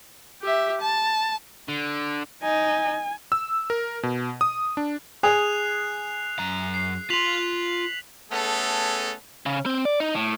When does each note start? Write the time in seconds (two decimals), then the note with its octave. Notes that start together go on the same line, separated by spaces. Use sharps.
0.42 G4 E5
0.81 A5
1.68 D3
2.43 D#4 G#5
3.32 E6
3.70 A#4
4.03 B2
4.41 D#6
4.77 D4
5.23 G#4 G#5 D#6 F#6 C7 F7
6.39 F#2 A#5
6.74 C7
7.10 F4 C6 B6 F7 F#7
8.31 A3 B3 C#4 G#4 A4
9.46 C#3
9.66 C4
9.85 D5
10.00 D#4
10.15 A2